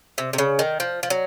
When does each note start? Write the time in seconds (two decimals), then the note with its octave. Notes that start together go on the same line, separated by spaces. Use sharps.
0.18 C3
0.33 C3
0.38 C#3
0.59 D#3
0.80 F3
1.03 F3
1.10 F#3